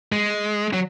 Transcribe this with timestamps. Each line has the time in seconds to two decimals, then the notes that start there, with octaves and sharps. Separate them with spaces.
0.12 G#3
0.73 F#3